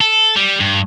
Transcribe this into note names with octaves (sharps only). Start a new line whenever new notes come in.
A4
G3
G2